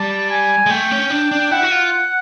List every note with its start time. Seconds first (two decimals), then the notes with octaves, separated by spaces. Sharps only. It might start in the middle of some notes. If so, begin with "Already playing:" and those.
Already playing: G3 A5
0.30 G#5
0.66 G#3
0.70 A3 G5
0.91 C#4
1.10 D4
1.31 D4
1.51 E4 F#5
1.63 F#4
1.71 F4